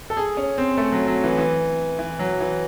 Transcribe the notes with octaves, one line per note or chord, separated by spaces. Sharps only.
A4
G#4
C#4
C4
A3
F#3
F#3
E3
E3
E3
F#3
E3